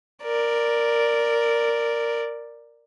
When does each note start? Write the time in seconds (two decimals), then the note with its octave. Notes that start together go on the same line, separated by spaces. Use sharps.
0.23 A#4 D5